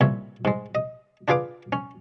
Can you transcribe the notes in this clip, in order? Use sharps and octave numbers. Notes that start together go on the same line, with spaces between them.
C2 A#2 C#5 E5
G#2 G#3
D#5
D4 F4 G#4 B4 F5 D6
C#4